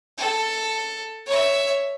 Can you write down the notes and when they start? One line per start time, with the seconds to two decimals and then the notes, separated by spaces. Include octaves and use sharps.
0.18 A4
1.26 C#5 E5